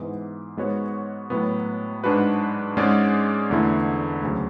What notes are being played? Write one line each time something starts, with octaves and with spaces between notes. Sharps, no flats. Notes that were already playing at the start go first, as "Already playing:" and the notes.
Already playing: G#2 E3 B3
G#2 G#3 B3 F#4 C#5
A2 F#3 B3
G#2 G#3 D4 F#4 B4
G#2 G#3 C#4 G#4 D5
E2 D3 A3 E4
D2 C#3 F#3